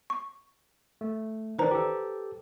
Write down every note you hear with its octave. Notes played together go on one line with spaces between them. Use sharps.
C#6
A3
D#3 E3 D4 B4 C5 A#5
G4 A4